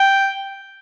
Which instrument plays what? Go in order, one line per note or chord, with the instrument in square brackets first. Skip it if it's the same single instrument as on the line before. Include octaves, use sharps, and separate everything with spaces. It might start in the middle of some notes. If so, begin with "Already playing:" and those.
Already playing: [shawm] G5